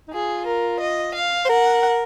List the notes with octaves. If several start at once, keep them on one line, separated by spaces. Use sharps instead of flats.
D#4
F4 G#4
A#4
D#5
F5
C5
A#4 F#5